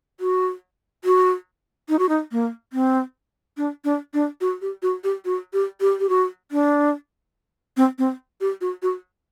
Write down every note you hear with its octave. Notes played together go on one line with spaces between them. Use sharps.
F#4
F#4
D#4
F#4
D#4
A#3
C4
D4
D4
D4
F#4
G4
F#4
G4
F#4
G4
G4
G4
F#4
D4
C4
C4
G4
F#4
F#4